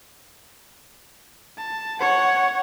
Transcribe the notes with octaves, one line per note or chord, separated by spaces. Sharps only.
A5
C#5 F#5